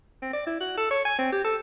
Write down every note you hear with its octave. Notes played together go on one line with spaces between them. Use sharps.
C4
D5
E4
F#4
A4
C#5
G#5
C4
G4
A4